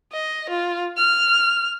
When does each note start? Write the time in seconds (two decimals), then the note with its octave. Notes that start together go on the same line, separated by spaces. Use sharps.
0.12 D#5
0.50 F4
0.97 F6